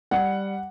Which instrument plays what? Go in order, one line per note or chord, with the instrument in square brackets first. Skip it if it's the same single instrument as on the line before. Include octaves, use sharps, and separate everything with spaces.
[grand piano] G3 F#5